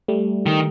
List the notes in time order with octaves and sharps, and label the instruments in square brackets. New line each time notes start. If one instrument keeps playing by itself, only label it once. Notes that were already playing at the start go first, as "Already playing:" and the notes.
[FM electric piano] G3 A3
[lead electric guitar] D#3